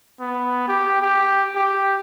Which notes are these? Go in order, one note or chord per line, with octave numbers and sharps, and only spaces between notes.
B3
G4
G4
G4